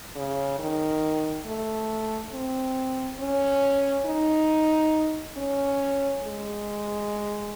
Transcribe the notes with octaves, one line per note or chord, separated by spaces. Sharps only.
C#3
D#3
A3
C4
C#4
D#4
C#4
G#3